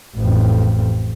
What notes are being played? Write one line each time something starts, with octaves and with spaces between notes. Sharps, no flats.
A1 F2